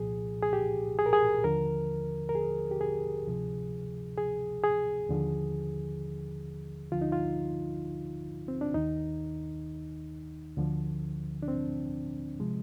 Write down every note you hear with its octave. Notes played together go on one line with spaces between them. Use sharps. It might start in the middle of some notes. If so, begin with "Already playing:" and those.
Already playing: C2 A#2 F3 G#4
G#4
G4
G#4
A#4
G#4
D#2 D3 F3 A#4
A#4
G#4
G4
G#4
D2 C3 F3
G#4
G#4
D#2 D3 F3
D2 D3 F3 F4
D#4
F4
C4
D4
D#2 D#3 D#4
D2 D3 F3
D4
C4
C3 F3 G#3